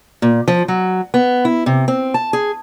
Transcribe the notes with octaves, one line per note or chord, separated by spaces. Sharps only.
A#2
F3
F#3
B3
E4
C3
C4
A5
G#4